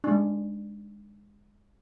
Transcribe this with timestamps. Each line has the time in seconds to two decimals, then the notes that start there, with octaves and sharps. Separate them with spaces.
0.04 G#3 D4